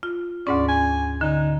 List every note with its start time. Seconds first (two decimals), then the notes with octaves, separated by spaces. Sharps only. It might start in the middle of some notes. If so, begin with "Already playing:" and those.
0.03 F4
0.47 D2 G#2 C#4 D5
0.68 G#5
1.21 D3 D#4